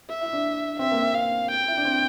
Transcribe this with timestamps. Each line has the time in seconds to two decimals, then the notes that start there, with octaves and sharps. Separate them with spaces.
0.09 E5
0.21 E4
0.33 D4
0.79 C4 E5
0.91 A#3
1.03 C4
1.14 F5
1.51 G5
1.68 E4
1.77 D4
1.85 C4